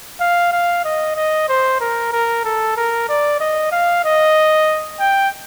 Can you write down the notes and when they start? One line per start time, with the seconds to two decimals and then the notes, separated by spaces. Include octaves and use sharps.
0.20 F5
0.52 F5
0.85 D#5
1.16 D#5
1.49 C5
1.81 A#4
2.12 A#4
2.45 A4
2.77 A#4
3.09 D5
3.40 D#5
3.72 F5
4.05 D#5
5.00 G5